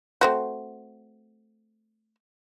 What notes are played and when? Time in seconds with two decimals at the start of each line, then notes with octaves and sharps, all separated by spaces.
0.21 A3 C4 F#4